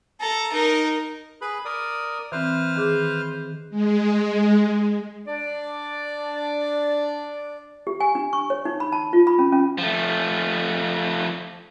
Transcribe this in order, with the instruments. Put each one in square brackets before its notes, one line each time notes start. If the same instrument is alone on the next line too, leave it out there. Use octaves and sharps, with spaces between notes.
[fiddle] A4 A#5
D#4 A#4
[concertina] G#4 B4 B5
A#4 D5 D#6
[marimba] E3 C4 [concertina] B4 C5 F6
[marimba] D#3 G#4 D6
[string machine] G#3
[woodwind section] D4 D5
[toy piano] G4
G#5
D4
C#6
C#5
D#4
B5
A5
F4
B5
C#4
C#4
[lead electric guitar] F3 A3